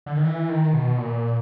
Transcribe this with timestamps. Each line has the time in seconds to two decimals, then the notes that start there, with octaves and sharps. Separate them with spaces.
0.06 D3
0.16 D#3
0.25 E3
0.49 D#3
0.73 B2
0.98 A#2